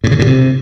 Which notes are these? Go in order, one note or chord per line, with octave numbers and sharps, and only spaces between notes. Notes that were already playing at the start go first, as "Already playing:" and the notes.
A2
C#3
A2
C3